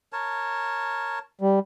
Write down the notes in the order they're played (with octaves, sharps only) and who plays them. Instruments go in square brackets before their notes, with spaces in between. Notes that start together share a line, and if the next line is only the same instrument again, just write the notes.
[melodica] A#4 C#5 A5
[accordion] G3